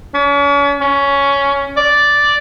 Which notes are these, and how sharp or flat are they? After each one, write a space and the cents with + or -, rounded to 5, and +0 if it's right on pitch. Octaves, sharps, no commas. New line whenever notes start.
C#4 +40
C#4 +10
D5 -5